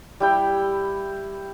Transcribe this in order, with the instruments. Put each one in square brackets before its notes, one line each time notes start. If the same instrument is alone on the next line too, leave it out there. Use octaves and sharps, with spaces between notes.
[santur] G3 E4 G5